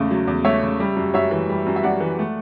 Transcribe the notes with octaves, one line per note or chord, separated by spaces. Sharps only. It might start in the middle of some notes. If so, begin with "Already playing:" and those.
Already playing: E2 C#3 A3
F#3
E2
A3 C#5 E5
C#3
G3
F#2
F#2 C#5 E5
E3
G3
F#2
E5
F#2 D5 F#5
E3
A3